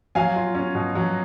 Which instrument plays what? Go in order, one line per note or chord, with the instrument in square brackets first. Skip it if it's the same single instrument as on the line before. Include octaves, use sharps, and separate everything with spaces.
[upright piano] F#3 F5 G#5
F4
C#4
B2
F#3